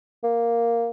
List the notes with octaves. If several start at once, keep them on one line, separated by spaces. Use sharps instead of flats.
A#3